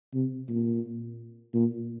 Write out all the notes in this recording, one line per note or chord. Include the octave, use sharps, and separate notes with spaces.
C3
A#2
A#2